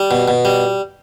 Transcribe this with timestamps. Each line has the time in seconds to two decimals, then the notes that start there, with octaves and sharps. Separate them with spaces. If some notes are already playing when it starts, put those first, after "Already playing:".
Already playing: G3
0.11 B2
0.28 B2
0.45 G3